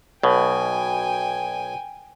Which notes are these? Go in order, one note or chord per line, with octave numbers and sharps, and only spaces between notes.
B1 B2 G5 G#5